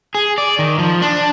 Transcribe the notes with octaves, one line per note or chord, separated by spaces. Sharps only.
G#4
D5
D#3
F3
D4